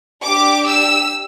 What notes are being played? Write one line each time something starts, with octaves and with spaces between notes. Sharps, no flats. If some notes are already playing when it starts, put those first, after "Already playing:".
D4 G4 D6
E6